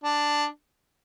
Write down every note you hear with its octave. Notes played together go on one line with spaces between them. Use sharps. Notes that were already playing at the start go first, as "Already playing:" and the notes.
D4